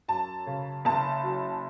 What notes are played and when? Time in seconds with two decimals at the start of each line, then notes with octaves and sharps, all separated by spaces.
0.08 F#2 A5
0.46 C#3
0.85 F#1 A5
1.24 F#3